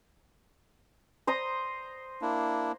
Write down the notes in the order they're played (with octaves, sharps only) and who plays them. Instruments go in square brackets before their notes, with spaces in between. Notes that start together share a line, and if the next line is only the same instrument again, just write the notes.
[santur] C5 A#5 D#6
[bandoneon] A#3 D4 E4